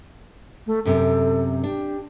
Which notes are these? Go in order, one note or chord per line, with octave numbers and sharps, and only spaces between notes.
A3
F#2 C3 A4
D4 G4